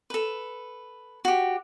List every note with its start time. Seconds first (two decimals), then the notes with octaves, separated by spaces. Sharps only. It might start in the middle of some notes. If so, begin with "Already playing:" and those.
0.10 A4 B4
1.25 F#4 G4